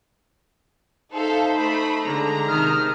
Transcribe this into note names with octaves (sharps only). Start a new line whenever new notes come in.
D#4 A4 C5 E5 F5
A3 B5
D3 G#3 A#5
C3 D#3 D#6 F6